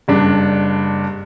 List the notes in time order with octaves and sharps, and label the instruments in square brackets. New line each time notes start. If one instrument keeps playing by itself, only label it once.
[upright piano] F#1 G2 D4